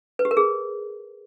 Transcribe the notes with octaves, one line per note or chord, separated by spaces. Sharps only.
B4
G4
A#4
G#4